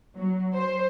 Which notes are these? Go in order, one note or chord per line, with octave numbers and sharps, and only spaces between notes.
F#3
C5